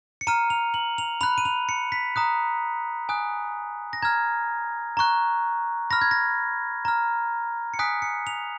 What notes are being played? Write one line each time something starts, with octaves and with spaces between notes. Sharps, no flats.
C#7
A#5 F6 D#7
F7
F#7
F7
B5 F#6 F7
D#7
F7
C#7
B6
A#5 D#6 F#6
G#5 D#6 F#6
A#6
A#5 F6 G#6
A#5 C#6 F#6
B5 F6 A#6
G#6
A#6
A#5 F6
C#7
G#5 D#6 F#6 B6
C#7
F7